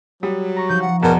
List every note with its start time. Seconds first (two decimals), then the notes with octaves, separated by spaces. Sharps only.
0.23 F#3 G3 D#6
0.56 A#5 C#6
0.69 F3 D#4 G6
0.82 F#5
1.03 E2 B2 A#4 E7